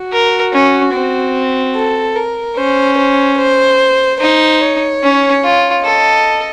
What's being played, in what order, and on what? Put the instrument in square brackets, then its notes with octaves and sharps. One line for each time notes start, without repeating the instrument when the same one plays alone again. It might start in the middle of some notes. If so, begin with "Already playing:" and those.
Already playing: [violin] F#4
[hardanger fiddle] A#4
C#4
C4
[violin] A4
A#4
[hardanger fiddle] C#4 [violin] C5
[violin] C5
C5
[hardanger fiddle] D#4 [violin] C5
[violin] C#5
[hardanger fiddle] C#4
F4
[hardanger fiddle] A4 [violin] D#5